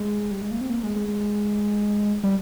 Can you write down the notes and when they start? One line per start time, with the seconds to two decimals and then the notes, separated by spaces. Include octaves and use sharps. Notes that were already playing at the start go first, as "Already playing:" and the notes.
Already playing: G#3
0.31 G3
0.41 G#3
0.51 A#3
0.61 C4
0.70 A#3
0.83 G#3
0.96 G#3
1.08 G#3
2.23 G3